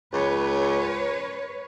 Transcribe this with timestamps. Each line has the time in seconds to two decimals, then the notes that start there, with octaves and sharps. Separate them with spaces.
0.13 C#2 B4 C#5